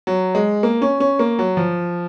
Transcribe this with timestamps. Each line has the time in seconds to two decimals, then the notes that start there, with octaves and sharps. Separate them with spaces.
0.07 F#3
0.35 G#3
0.63 A#3
0.82 C#4
1.00 C#4
1.19 A#3
1.39 F#3
1.57 F3